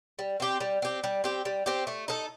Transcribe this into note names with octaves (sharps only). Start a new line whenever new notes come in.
G3
C4 G4
G3
C4 G4
G3
C4 G4
G3
C4 G4
A3
D#4 A4